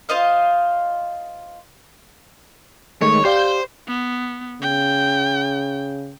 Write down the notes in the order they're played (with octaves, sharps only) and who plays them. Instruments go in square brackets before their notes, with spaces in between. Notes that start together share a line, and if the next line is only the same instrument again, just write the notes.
[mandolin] F4 C5 D#5 F5
[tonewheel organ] D#3 G#3 [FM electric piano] A3 [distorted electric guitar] C#5
[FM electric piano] G4 D5 F5 [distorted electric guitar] C5 [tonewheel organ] G6
[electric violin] B3
[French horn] C#3 [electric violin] G5